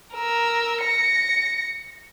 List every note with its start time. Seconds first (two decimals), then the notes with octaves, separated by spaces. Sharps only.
0.15 A#4 E6
0.82 A#6 C#7